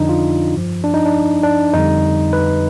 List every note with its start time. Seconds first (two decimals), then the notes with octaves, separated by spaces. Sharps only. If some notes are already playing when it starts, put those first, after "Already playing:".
Already playing: F2 D3 F3 D4 D#4
0.09 F4
0.54 G2 F3
0.84 D4
0.94 D#4
1.06 D4
1.43 D4
1.74 F2 D3 G3 D#4
2.33 B4